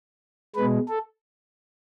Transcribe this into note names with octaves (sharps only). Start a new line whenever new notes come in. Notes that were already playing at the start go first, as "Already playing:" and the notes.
B2 G#3 B4
A4